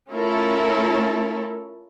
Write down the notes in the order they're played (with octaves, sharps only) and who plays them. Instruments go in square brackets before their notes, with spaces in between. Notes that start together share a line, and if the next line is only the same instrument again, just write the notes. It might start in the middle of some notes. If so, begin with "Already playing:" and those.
[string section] A3 C#4 E4 F4 A4 A#4